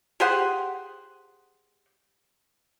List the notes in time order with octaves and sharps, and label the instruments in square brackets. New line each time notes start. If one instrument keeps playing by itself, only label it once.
[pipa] G4 G#4 C5 F#5